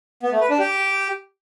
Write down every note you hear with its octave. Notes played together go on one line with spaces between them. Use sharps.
B3
A3
B4
D4
G4